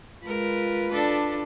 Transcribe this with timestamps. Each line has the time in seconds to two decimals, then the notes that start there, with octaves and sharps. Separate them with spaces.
0.25 G#3 F4 A#4 B4
0.91 D4 A4 D5